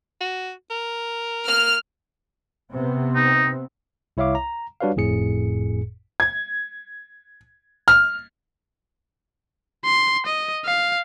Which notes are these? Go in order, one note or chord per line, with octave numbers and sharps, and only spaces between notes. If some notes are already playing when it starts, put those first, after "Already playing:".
F#4
A#4
A#3 F6
C3 B3 C4
D#4
C2 E4 C#5 E5 F5 D6
A#5
G3 D4 F#4 B4 C#5 F5
G1 F2 A2 G#4 C#7
G#6
F6
C6
D#5
F5